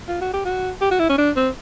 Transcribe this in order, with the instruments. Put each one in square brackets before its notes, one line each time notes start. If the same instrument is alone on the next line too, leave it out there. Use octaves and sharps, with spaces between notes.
[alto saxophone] F4
F#4
G4
F#4
G4
F#4
E4
C#4
D4
C4